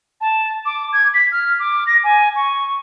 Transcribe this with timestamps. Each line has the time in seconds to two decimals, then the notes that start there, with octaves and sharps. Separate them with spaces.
0.21 A5
0.66 D6
0.93 G#6
1.14 B6
1.32 F6
1.59 D6
1.87 A#6
2.04 G#5
2.36 C#6